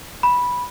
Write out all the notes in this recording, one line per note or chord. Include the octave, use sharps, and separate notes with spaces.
B5